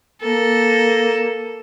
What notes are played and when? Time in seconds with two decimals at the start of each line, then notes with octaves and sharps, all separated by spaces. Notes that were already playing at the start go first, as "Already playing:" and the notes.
0.21 A#3 A4